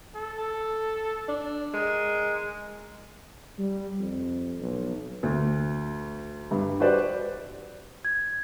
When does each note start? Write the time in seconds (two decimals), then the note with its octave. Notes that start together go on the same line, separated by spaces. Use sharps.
0.16 A4
1.29 D4
1.74 G#3 A#4
3.58 G3
4.00 F2
4.61 B1
5.23 D2
6.51 G2
6.80 F#4 G4 B4 C5 D5
8.05 G#6